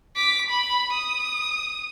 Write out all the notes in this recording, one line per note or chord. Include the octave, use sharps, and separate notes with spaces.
D6 B6
B5
D#6